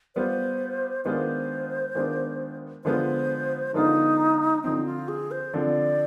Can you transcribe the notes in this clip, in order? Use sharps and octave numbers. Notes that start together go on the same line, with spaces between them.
G3 B3 F4 C5
D#3 G#3 B3 D4 F4 C5
D#3 G#3 B3 D4 F4
D3 F3 G#3 B3 F4 C5
D3 F3 G#3 B3 D#4 F4
D3 F3 C4 D#4
F4
G#4
C5
D3 F3 C4 D5